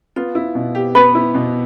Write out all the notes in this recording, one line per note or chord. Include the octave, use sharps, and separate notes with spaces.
B3 F4
E4
B2
G4
B3 B4
E4
B2